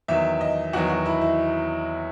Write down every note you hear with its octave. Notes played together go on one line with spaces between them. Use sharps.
E2 D#3 F#3 E5
D#5
E2 D#3 F#3 F#4
F#4
E4
E4